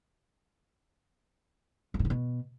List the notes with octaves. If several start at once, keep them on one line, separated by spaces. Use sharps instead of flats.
E2
A2
C3
B2